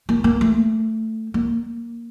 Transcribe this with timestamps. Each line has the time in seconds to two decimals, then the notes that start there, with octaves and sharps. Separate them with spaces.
0.09 A#3
0.24 A#3
0.41 A3
1.34 A#3